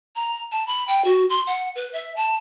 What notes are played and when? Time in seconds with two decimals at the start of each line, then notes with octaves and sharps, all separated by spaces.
0.16 A#5
0.52 A5
0.67 B5
0.88 G5
1.05 F#4
1.30 C6
1.47 F#5
1.75 B4
1.93 E5
2.16 A5